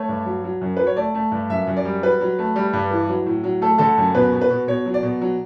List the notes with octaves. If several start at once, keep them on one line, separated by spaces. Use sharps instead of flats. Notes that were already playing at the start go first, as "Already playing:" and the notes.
Already playing: A3 C#5
G2
F#3
F#3
F#2
F#3 B4
C#5
A3 D5
A3
G2
F#2 E5
F#2
D5
G3
F#3 B4
F#3
A3
G3
G2
E3
F#3
A2
F#3
A3 A4
D3 A4
F#2
B2 B4
B2
B4
B2
B2 C#5
F#3
D5
B2
F#3